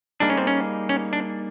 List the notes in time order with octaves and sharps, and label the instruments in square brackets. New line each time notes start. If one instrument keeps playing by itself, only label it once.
[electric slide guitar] G3 A#3 D#4 G#4 [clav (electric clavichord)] D4
[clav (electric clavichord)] C#4
C4
C#4
C#4
D4